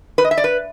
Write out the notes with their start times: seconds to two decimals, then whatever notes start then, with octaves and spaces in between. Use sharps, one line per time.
0.18 B4
0.25 D#5
0.31 E5
0.38 D5
0.44 B4